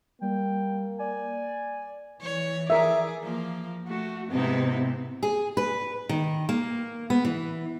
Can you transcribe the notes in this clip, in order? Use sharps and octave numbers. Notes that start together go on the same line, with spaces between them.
G3 A#3 G5
D5 G#5
E3 C#5
G#4 A#4 D5 E5
F3 A#3
A3 F#4
G#2 C3 B3 C4 D#4 E4
G#4
B4
D#3
A#3
B3
E3